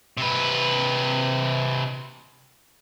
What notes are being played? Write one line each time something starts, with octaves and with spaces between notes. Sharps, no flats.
C3 B4